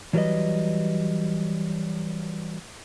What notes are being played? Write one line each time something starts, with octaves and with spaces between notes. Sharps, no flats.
E3 F#3 G3 A#4 B4 D#5